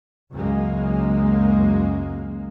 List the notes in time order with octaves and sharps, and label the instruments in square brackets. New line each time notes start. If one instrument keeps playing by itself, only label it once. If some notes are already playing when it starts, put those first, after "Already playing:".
[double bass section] C#2 F#2 G#3 A#3